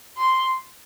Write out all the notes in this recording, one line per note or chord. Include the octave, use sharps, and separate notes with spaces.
C6